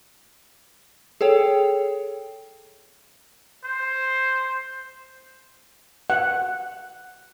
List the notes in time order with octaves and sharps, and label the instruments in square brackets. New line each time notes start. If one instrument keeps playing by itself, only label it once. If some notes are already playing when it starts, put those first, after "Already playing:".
[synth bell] G#4 A4 C#5 G5
[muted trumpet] C5
[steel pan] F#5